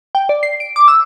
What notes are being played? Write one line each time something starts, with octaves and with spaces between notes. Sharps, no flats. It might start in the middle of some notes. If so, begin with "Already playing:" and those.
G5
D5
C7
D7
D6
E6